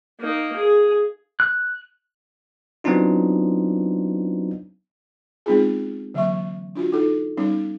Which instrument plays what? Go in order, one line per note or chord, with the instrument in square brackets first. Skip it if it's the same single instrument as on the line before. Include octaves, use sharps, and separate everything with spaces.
[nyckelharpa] A#3 D#4
G#4
[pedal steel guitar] F#6
[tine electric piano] F#3 B3 C4 D4 D#4 F4
[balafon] G#3 B3 C4 D#4 F4 G#4
D3 E3 F#3 A#3 E5 C#6
D4 F4 F#4
D#4 F4 A4
G3 B3 C#4 D#4